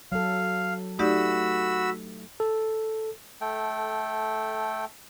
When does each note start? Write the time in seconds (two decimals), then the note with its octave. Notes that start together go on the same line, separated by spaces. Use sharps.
0.12 F#3 A4 F5
0.99 A3 D#4 F#4 G4 D5 B5 E6
2.40 A4
3.41 A3 A4 G5